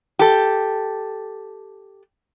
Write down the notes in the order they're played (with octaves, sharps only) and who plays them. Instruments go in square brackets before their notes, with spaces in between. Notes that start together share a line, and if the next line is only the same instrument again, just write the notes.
[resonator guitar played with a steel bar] G4 A4